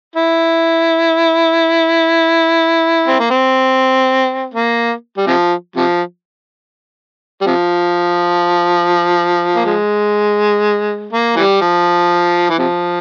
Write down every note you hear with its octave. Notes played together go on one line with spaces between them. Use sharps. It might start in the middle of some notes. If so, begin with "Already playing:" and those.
E4
C4
A#3
C4
A#3
G3
C3 F3
C3 F3
G3
C3 F3
A#3
G#3
A#3
E3 G3
F3
E3
C3 F3